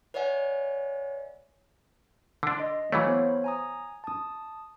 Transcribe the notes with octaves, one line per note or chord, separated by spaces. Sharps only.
B4 C#5 D5 E5 F#5 G#5
D3 D4 C6
D#5
E3 F#3 A3 C#5 F5 B5
B3 C5 C#5
G#5 A#5 D#6
A5 D#6